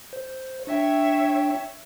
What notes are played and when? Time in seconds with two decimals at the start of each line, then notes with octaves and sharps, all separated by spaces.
0.13 C5
0.67 D4 C#5 E5 G5